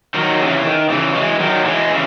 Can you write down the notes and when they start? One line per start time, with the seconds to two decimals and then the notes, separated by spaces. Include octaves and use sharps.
0.14 D#3 F#3
0.39 C#3 E3
0.64 D#3
0.90 C#3 E3
1.15 E3 G#3
1.40 D#3 F#3
1.65 E3 G#3
1.90 C#3 E3